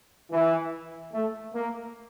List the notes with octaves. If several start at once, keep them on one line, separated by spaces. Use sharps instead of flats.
E3
A3
A#3